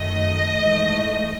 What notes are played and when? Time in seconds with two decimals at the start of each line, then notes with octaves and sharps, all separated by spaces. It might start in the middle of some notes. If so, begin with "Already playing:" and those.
Already playing: F#2 D#3 A3 D#5
0.57 G#2 E3 A3